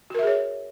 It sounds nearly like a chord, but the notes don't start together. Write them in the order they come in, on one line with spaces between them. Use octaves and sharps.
F#4 A#4 E5 G#4 C#5